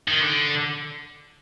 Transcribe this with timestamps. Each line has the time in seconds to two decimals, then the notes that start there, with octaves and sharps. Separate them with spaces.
0.08 D#3
0.21 D3